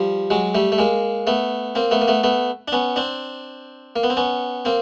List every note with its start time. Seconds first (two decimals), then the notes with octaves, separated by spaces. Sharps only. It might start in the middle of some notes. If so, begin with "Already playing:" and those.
Already playing: F3 G3
0.30 F#3 G#3
0.55 G3 A3
0.72 A3
0.78 G#3 A#3
1.27 A3 B3
1.75 A#3 C4
1.91 A3 B3
2.01 A#3
2.08 A3 B3
2.23 A3 B3
2.68 D4
2.72 B3 C#4
2.96 C4 D4
3.96 A#3
4.03 B3
4.10 C4
4.17 B3 C#4
4.65 A#3 C4